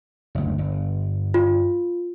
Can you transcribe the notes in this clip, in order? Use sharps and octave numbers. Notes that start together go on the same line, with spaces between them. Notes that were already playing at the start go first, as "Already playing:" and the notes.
F#1 D2
G1
F4